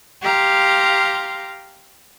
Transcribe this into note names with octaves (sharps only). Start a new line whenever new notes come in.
G4 F5 A#5 C6